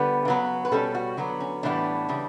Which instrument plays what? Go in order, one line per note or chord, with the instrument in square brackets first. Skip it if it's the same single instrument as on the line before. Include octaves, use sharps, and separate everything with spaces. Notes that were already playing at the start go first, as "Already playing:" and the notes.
Already playing: [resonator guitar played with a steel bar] D3 G3 B3 B4
C#3 F#3 B3
B4
B2 G3 C#4 A4
F#4
D3 F#3 B3
C#4
A2 E3 G3 B3 D4
C#3 E3 G3